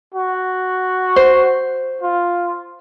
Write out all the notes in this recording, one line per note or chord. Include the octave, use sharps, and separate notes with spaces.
F#4
C5
F4